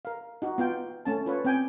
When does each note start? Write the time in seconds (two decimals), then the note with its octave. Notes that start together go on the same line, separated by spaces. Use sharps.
0.05 A#4 F5
0.42 D#4 F#4
0.58 B3 F4 G5
1.05 A3 C#4 A5
1.26 F4 B4 C#5
1.45 C4 G5 G#5